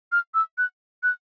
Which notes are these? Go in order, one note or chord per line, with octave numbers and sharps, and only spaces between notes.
F6
E6
F#6
F#6